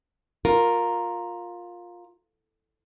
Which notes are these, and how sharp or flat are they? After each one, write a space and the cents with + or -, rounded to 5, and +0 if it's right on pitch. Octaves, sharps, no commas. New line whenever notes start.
F4 +15 A#4 +0